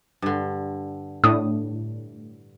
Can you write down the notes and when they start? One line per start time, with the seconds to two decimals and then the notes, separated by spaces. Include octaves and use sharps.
0.22 G2 D3
1.24 A2 D4 D#6